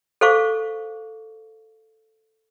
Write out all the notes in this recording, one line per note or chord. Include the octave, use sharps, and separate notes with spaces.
A4 C5 F5 C#6 D6